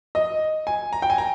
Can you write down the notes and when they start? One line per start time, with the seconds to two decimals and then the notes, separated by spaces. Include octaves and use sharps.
0.15 D#5
0.67 G#5
0.93 A#5
1.02 G5
1.10 G#5
1.18 A#5